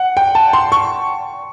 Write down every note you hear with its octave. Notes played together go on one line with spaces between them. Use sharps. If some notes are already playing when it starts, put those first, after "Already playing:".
Already playing: F#5
G5
A5
C6
C#6